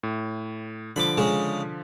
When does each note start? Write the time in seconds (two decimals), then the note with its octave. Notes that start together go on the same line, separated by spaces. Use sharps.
0.03 A2
0.96 D3 F3 B5 D6
1.17 C#3 G#3